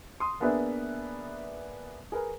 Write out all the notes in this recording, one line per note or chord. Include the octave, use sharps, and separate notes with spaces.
C6 D#6
A#3 B3 D4 G#4 B4 E5
G#4 A#4 B4